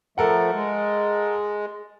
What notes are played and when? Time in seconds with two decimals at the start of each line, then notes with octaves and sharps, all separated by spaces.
0.18 F3 A3 A4 A#4 F#5
0.53 G#3